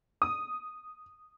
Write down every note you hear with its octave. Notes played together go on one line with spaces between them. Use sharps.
D#6